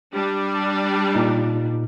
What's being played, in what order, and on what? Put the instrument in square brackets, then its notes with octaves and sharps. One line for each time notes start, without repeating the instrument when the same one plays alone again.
[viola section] G3 D4
[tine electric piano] A#2 D#4 D6